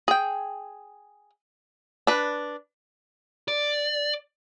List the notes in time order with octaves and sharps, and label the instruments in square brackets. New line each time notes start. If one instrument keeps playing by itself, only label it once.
[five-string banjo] G#4 G5
D4 B4
[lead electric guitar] D5